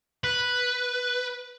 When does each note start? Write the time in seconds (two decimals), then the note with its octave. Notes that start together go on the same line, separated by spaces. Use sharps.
0.24 B4